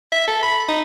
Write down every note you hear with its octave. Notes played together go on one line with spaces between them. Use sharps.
E5
A4
B5
D#4